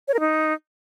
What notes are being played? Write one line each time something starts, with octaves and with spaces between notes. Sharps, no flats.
C#5
A#4
D#4